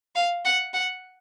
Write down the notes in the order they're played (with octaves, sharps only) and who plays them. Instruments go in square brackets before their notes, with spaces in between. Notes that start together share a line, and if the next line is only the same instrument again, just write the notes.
[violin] F5
F#5
F#5